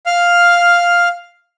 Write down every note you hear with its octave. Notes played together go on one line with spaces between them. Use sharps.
F5 F6